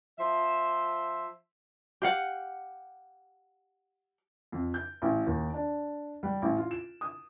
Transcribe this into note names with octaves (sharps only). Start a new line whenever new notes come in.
F3 C5 E5
G4 F5 F#5
F2
G6
A1
D#2
D4
G3
A1
F4
E7
D#6